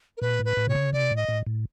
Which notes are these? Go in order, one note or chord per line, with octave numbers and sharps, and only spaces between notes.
A#4
A#2 B4
A2
B4
A2
C3 C#5
C#3
C3 D5
A2
D#5
A2
A2